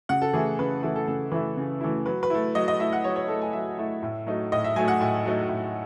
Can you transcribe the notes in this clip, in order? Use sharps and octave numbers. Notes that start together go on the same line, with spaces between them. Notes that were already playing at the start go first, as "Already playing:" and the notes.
C#3 F#5
A4
E3 A3 E4 G#4
C#3 B4
E3 A3 E4 A4
A4
C#3 A4
E3 A3 E4 B4
C#3
E3 A3 E4
F#3 B4
B4
A3 E4
F#3 D#5
D#5
A3 E4 E5
F#5
F#3 C#5
C#5
A3 E4 A4
G#5
F#3 E5
A3 E4
A2
F#3 A3 D#4
A2 D#5
E5
F#3 A3 D#4 G#5
F#5
A2 G#5
F#3 A3 D#4
A2